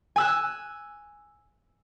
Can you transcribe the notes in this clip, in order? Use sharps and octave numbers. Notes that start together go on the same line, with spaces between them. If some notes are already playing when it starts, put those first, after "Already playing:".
G#5 E6 F#6